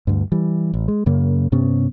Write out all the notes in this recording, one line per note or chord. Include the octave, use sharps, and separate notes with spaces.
D2 G2
E3 G3
A1
G#3
F#2 C#3 A#3
G2 C3 B3 C#4